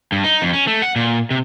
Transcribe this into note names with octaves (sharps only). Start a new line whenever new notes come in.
G2
D#4
F2
C#4
A3
F#5
A#2
C3